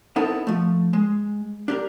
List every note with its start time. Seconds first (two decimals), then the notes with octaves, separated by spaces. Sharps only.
0.16 B3 C4 D#4 E4 A4 A#4
0.47 F3 A3
0.93 G#3
1.68 D4 G4 A#4